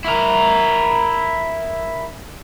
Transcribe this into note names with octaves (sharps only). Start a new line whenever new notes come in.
E4 A#4